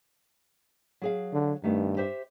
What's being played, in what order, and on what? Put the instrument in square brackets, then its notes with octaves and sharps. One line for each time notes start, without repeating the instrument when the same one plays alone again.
[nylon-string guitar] F#3 G#4 F5
[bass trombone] D3
[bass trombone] G2 [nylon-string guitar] D#3 A3 B3
[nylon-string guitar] G4 C5 E5